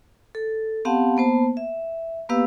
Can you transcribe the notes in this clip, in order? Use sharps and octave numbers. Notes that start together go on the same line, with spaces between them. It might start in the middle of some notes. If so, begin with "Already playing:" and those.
A4
B3 C4 G4 F5 F#5 A5
A#3 B3 C5 A5
E5
A#3 B3 G4 B4 F5 E6